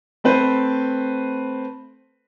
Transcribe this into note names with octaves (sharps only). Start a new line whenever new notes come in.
A3 C4 B4 C5